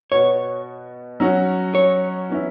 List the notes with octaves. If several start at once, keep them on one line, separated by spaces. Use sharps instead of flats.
B2 B3 F#4 C#5
F#3 C#4 F#4
C#5
E3 C#4 E4